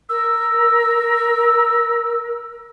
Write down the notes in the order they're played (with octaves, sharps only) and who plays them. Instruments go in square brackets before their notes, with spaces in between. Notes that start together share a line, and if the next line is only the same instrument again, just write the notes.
[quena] A#4 [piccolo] E6